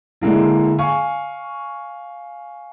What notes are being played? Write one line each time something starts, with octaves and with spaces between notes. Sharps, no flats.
D3 G#3 A#3 E4
F5 G#5 C#6